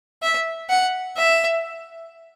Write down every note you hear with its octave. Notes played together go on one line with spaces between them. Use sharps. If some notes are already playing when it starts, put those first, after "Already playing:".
E5
F#5
E5